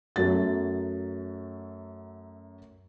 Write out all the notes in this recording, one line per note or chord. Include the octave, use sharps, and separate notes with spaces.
F#2 F#3 A3 A6